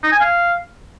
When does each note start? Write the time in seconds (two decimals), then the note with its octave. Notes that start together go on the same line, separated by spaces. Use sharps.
0.03 D#4
0.12 G#5
0.20 F5